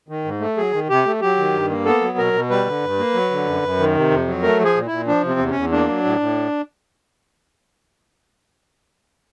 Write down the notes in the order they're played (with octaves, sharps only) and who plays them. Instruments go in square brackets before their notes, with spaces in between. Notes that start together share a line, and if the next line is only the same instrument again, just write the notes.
[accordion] D#3
G#2
A3
F#3 G#4
D#3
C3 G4
A3
F#3 G4
D#3
G2
A#3
B3 A4
F#3
B2 A#4
B2
G3 B4
D3
G2
A#3
F#3
D3
F#2
F#2
D#3
C3
F2
F#3
A3 A#4
F3 G#4
A#2
A#2 E4
F3 D4
C3
C4
E2
E2 C#4
A#3 D4
F#3
A2
A2